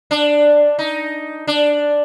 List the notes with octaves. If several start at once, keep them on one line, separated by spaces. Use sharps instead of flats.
D4
D#4
D4